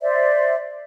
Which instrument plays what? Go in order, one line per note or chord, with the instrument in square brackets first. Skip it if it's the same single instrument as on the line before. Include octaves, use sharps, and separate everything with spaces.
[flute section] C5 D5 E5